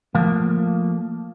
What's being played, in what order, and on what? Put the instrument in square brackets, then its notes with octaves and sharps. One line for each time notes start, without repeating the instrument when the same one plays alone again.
[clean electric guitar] F3 A3 A#3